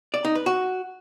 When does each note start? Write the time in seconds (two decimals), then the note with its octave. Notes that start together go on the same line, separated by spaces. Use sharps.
0.14 D5
0.25 D#4
0.35 B4
0.46 F#4